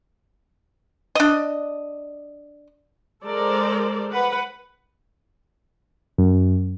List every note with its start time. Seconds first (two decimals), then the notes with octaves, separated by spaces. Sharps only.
1.15 D4 D#5
3.26 G#3 A4 A#4 C5 D5
4.11 B4 F#5
6.18 F#2